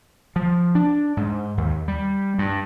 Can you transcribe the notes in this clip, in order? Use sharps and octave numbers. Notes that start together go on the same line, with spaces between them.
F3
D4
G#2
D#2
G3
G2